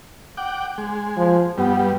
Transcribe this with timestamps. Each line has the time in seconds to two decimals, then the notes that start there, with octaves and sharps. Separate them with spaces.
0.37 F#5 G5 D6
0.78 G#3
1.17 F3
1.58 G2 G3 B3